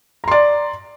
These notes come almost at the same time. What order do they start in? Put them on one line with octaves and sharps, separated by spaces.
A#5 C6 D5